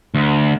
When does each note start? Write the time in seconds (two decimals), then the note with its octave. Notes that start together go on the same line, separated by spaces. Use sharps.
0.14 D2